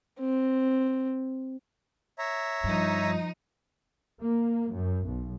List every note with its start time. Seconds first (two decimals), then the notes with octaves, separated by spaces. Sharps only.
0.20 C4
2.18 C#5 E5 A#5
2.64 G2 F3 D#4
4.22 A#3
4.72 F#2
5.05 B1